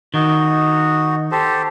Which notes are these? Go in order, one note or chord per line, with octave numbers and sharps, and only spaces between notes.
D#3 D#4 F#4
G4 A4 C5